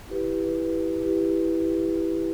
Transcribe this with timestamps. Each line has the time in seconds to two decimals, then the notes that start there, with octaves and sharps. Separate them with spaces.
0.10 E4 G4 B4
1.02 E4 G4 B4